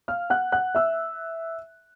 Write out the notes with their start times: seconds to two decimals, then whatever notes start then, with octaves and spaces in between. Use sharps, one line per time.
0.08 F5 F6
0.30 F#5 F#6
0.52 F#5 F#6
0.75 E5 E6